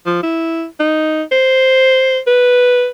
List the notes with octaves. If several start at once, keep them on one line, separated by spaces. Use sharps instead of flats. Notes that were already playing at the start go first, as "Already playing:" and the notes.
F3
E4
D#4
C5
B4